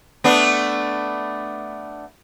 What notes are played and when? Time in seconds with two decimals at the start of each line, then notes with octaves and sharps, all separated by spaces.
0.24 A3 B3 D4